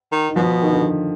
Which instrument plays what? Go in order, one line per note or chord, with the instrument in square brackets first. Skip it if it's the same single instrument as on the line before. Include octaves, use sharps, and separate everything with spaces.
[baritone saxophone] D#3
[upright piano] D#3
[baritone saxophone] B2 [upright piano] F3
[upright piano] D#3
D3